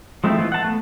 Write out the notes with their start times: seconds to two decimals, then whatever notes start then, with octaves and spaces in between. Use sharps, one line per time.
0.24 F3 G#3 A3 C4 E4
0.38 E3 F4
0.52 F#5 A5
0.64 A3 B3